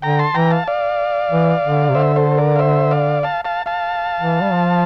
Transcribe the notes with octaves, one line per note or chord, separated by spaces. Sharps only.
D3 G5 A#5
A5 C6
E3 G5 A#5
F5 A5
D5 F5
E3
D3
C3
D3 C5 E5
A4 C5
A#4 D5
F5
C5 E5
D5 F5
F5 A5
F5 A5
F5 A5
E3
G3
F3